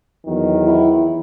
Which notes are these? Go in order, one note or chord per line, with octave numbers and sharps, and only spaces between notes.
E2 D#3 F#3
E4